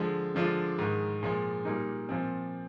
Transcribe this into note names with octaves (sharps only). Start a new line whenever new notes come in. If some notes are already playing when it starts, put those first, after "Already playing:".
Already playing: D3 F3 G#3
D3 F3 G#3 D4 F4
G#2 D#3 G#3
A#2 F3 G#3
A#2 G3 A#3 D#4
A#2 F3 C4